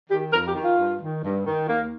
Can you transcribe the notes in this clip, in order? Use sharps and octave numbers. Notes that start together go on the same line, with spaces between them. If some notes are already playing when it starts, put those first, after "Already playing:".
D#3 G4
F2 A#4
G4
D#3
F4
G2
D#3
G2
D#3
D#2 A#3